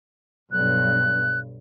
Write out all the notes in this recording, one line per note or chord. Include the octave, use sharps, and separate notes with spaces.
B1 G2 F#6